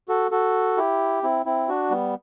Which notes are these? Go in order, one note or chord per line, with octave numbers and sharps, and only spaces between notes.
F#4 A4
F#4 A4
E4 G4
C4 E4
C4 E4
D4 F#4
G3 B3